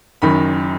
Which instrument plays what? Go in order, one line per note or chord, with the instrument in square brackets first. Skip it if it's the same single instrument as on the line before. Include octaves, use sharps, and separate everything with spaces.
[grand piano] F#1 F#2 D#3 B5